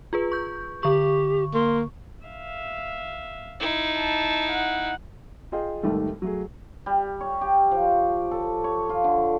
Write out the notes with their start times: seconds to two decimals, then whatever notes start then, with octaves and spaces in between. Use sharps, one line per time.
0.13 F4 G#4 B4
0.32 C#6 G6
0.83 D3 G4 C#6
1.54 A#3 C6
2.26 E5 F5
3.60 D#4 E4
3.96 A5
4.52 F#5
5.52 F4 G#4 D#5 G5
5.83 C2 G#2 D#3 G3 A3
6.22 F#3 A3 G#4
6.86 G3
7.21 C#5
7.41 G4
7.71 F3
8.31 A4
8.64 C#5
8.89 F4
9.04 D3